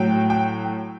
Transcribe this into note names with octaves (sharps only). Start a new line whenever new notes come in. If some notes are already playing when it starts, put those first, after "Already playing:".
Already playing: A2 F#3 G5
G5